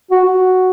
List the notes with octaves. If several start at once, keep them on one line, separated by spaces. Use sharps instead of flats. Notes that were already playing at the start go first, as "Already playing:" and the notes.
F#4
F#4